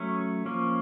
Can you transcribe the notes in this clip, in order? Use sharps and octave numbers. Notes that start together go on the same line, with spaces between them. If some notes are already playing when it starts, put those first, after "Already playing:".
Already playing: F#3 A3 C#4
F3 A#3 C#4